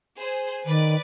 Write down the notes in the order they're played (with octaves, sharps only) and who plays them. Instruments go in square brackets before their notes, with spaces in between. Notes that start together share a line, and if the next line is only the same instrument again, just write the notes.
[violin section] G#4 C5
[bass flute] D#3 [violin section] B4 D5